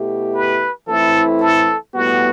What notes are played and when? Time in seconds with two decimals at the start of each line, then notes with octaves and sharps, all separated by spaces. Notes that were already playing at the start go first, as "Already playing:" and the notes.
Already playing: B2 A3 E4 G4
0.34 B4
0.88 E3 A3 C4 E4 A4
1.40 A4
1.93 A2 G3 B3 F#4